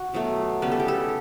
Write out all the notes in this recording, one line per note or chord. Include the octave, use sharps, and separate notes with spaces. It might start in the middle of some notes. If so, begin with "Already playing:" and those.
Already playing: F#4
B2 F#3 A3
C#3 G3 B3 B4
A4
G4
A4